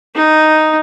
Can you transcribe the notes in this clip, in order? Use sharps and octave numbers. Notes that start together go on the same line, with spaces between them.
D#4